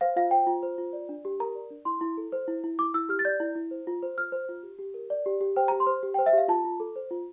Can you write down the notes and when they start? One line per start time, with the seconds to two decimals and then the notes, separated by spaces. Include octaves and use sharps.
0.01 C5 F5
0.16 F4 F5
0.31 C5 G5
0.47 F4
0.63 C5
0.78 F4
0.93 D5
1.09 D4
1.25 G4
1.40 A#4 A#5
1.55 D5
1.70 D4
1.85 E4 C6
2.01 E4
2.17 A4
2.32 C5
2.48 E4
2.64 E4
2.79 E4 D6
2.94 E4 E6
3.09 G4 F6
3.19 A6
3.25 D5 G6
3.40 E4
3.55 E4
3.71 C5
3.87 F4
4.03 C5
4.18 F4 F6
4.32 C5
4.49 F4
4.63 G4
4.79 G4
4.94 A#4
5.10 D5
5.26 G4
5.41 G4
5.56 C5 G5
5.68 A#5
5.72 G4
5.80 C6
5.87 C5
6.03 G4
6.14 G5
6.19 C5
6.26 E5
6.33 G4 F5
6.48 F4 A5
6.64 F4
6.80 A4
6.96 C5
7.11 F4